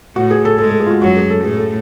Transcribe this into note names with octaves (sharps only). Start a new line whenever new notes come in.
A2 A3 F#4
G#4
A4
G#2 G#3 A4
A4
G#4
F4
F#4
F#2 F#3 F#4
G#4
A4
A2 A3 G#4
A4